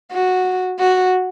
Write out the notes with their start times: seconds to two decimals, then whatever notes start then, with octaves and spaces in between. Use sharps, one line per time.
0.12 F#4
0.79 F#4